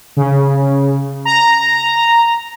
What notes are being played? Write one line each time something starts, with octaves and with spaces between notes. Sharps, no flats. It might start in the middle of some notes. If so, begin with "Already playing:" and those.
C#3
A#5